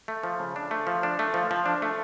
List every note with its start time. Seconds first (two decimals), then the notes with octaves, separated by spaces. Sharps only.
0.08 A3
0.23 F3
0.39 C#3
0.56 D4
0.71 A3
0.87 F3
1.03 D4
1.19 A3
1.34 F3
1.51 F3
1.66 D4
1.82 A3